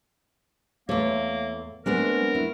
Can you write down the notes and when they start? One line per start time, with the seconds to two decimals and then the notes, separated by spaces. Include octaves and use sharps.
0.89 E2 A3 A#3 C#5
1.86 G#3 A3 B3 C4 D4 A#4
2.35 A3 E4